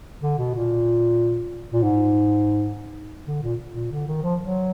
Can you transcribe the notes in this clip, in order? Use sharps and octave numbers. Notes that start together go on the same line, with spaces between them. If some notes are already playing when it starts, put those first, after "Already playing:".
D3
B2
A#2
A#2
G#2
D3
A#2
A#2
D3
D#3
F3
F#3